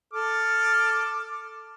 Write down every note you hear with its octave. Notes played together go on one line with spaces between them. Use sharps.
A4 D6 F6